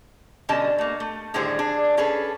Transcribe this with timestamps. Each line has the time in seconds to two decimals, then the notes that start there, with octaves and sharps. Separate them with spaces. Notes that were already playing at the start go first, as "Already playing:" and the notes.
0.49 B2 D3 G3 C#4 D#5 A5
0.78 A3 A#3
1.00 A3
1.34 A2 D3 D#3 G3 G#4 C5
1.59 D4 G#4
1.97 C#4 G#4 A4 B4